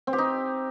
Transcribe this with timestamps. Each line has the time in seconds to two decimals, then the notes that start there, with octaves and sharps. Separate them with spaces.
0.07 C4
0.13 G4
0.18 D#4